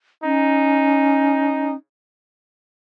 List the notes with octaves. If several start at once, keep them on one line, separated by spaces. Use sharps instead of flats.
C#4 D#4